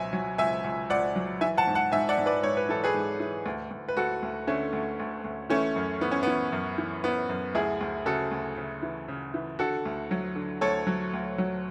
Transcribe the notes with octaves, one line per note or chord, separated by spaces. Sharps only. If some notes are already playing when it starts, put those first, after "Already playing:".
Already playing: C#2 B2 F#3 E5 G#5
F#3
C#2 E5 G#5
C#2
C#2 D5 F#5
F#3
E3 E5 G#5
F#5 A5
G#2
F#5 A5
G#2 E5 G#5
D5 F#5
G#2
B4 D5
G#2 C#5
B4
E3 A4
G#4 B4
G#2
E3
D2
D2
B4
D2 F#4 A4
D2
D3 A3 C#4
D2
D2
D2
E3 A3 C#4
F#2
E3 B3
C#4
E3 B3
F#2
E3
E3 B3
F#2
D2 E4 G#4
D2
C#3 F#4 A4
D2
C#3
E3
C#3
E3
D3 F#4 A4
D2
F#3
D3
D2 A4 C#5
F#3
D2
F#3